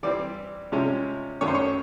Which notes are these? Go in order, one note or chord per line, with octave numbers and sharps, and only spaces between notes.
E3 G3 C4 D5
C3 F3 G#3 C#4 E4
F#2 D#3 F#3 A3 C#4 C#5
C5
C#5